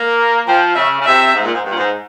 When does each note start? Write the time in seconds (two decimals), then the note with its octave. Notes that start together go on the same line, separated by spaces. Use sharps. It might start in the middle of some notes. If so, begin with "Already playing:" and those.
Already playing: A#3
0.47 F3 G5
0.75 C#3 E5
0.99 C#3
1.05 C3 E5
1.34 G#2
1.43 A#2
1.52 G#2
1.62 G2
1.70 A#2
1.76 G#2